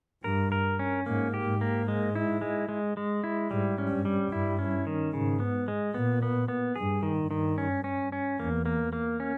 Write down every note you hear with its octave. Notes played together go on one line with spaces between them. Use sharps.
G2 A#4
A#4
C#4
G#2 A#3
G4
G#2
A#3
G#3
E4
G#3
G#3
G#3
E4
G#2 G3
C#4
G2
G3
G2 E4
C#4
D#3
G#2 C#3
B3
G#3
A#2 B3
B3
B3
G2 G#4
D#3
G2
D#3
C#4
C#4
C#4
E2 A#3
A#3
A#3
C#4